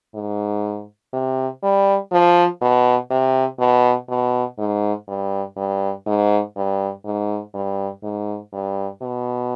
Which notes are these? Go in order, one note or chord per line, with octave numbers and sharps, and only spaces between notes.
G#2
C3
G3
F3
B2
C3
B2
B2
G#2
G2
G2
G#2
G2
G#2
G2
G#2
G2
B2